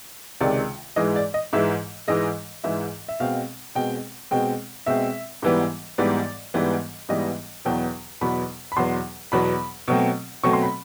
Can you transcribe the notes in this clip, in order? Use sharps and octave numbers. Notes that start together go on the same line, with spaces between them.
C#2 C3 D#3 G#3 D5
G#2 E3 G#3 D#5
D5
D#5
G#2 E3 G#3 E5
G#2 E3 G#3 D#5
G#2 E3 G#3 E5
E5
B2 G#3 C4 F5
B2 G#3 C4 G5
B2 G#3 C4 G5
B2 G#3 C4 E5
G#2 E3 G3 B3
G#2 E3 G3 B3 D5
G#2 E3 G3 B3
G#2 E3 G3 B3 D#5
E2 B2 F#3 B3 G5
E2 B2 F#3 B3 B5
B5
E2 B2 F#3 B3 C6
E2 B2 F#3 B3 B5
B2 F#3 A3 C4
B2 F#3 A3 C4 C#6
C6
B5